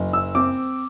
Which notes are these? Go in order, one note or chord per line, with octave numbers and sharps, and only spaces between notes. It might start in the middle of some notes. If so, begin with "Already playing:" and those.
Already playing: F#1
E6
C4 D6